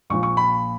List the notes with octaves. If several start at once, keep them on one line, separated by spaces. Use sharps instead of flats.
A#1 A#2 F3 C#6
C#6
B5